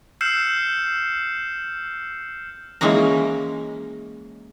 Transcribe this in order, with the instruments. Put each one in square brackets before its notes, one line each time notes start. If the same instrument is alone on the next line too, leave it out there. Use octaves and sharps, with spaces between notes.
[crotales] E6 F6 G6 C7 C#7 E7
[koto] E3 G#3 A#3 C#4 A#5